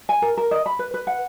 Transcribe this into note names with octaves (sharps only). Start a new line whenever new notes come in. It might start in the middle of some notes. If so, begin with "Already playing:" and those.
G#5
A#4
A#4
D#5
B5
B4
B4
F#5